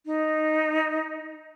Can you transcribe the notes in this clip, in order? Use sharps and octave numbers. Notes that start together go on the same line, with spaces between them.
D#4